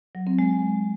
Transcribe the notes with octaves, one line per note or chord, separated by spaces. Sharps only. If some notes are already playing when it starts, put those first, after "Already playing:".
F#3
C4
G#3